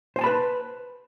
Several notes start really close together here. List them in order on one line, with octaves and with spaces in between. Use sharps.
C5 G#5 A5 B5 B4